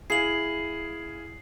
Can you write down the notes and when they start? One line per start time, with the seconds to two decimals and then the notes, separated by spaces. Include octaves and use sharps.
0.10 E4 G#4 F5 C7 F#7